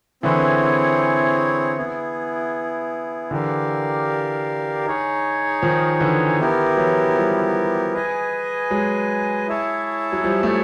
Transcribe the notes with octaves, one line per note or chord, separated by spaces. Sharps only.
D3 E3 C4 E4 G#4 C#5
B3 E4 G#4
D3 E3 G4 A#4 D5 F5
D#4 G#4 C#5
D#3 F3
D3 E3
B3 E4 G4 A#4
E3 F#3
F3 G3
G#4 B4 D#5 G#5
F#3 G#3
E4 G#4 C#5 E5 A5
F#3
F3 G3
A3